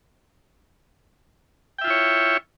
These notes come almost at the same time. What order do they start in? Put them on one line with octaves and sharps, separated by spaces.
G5 E5 F4 E4 C#5